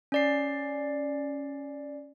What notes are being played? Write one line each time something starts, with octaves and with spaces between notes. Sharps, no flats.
C#4 D5 C7